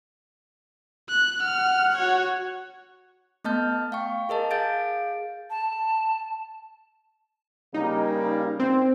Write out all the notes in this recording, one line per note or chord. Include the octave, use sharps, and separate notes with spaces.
F#6
F#5 F6
F#4 C#5
A3 B3 D#5 A5 F6 G6
F5 G5 C#6
G#4 A#4 D#5 A5
G#4 F5 G6 A6 D7
A5
C#3 G3 A#3 D#4
C4